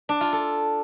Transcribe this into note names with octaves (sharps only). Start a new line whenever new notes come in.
D4
F4
A4